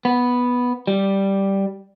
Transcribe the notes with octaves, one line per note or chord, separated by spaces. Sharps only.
B3
G3